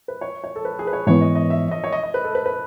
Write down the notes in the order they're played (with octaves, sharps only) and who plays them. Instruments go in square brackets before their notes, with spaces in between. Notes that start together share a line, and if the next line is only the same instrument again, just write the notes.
[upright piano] B4
C#5
C#5
A4
B4
G#4
B4
C#5
[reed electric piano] G#2 E3 B3 [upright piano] C#5
[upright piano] D#5
D#5
E5
D#5
C#5
D#5
D#5
B4
A4
B4
B4